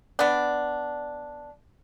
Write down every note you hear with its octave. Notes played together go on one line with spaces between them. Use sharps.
B3 D4